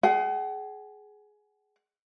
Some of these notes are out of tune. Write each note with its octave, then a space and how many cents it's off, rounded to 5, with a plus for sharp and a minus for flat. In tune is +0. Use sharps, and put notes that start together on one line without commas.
G#4 +15 F#5 +40